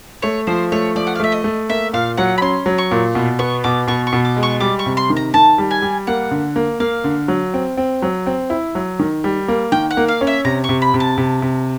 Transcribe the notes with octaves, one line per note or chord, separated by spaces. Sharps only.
A3 C#5
F3 C5
A3 C#5
F3 D5
F#5
F5
A3 E5
D#5
A3
A#3 E5
A#2 F5
F#3 F#5
B5
C#4 C6
F#3
C#6
A#2
B2
B3 C#6
B2 D6
B2 C#6
C#6
B2
D6
G#3
C#6
G3 D6
C#6
C3
C6
D#3
A#5
D#3 A5
G3
G#5
G3
A#3 F#5
D3
A#3
A#3 F5
D3
F#3
C4
C4
F#3
C4
E4
F#3
D#3
G3
A#3
D#3 G5
F#5
A#3
F5
C#4
E5
C3 A#5
C#6
C3
B5
C3
A5
C3
C3